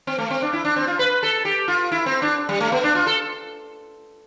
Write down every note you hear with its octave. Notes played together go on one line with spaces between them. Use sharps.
C4
A3
C4
D4
E4
D4
C4
F4
B4
A4
G4
F4
E4
C4
D4
G3
A3
B3
D4
F4
A4